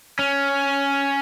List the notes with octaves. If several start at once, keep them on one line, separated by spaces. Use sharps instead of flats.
C#4